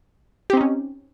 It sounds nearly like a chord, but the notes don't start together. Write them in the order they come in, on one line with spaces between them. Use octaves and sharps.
G4 C4 D#4 C#4